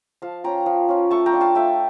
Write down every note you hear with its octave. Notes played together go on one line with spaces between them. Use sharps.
F3 F5 A5
C#4 F4 G5 A#5
F3
C#4 F4
A3 A5 C#6
G5 A#5
D4 F4
F5 A5
A3 E5 G5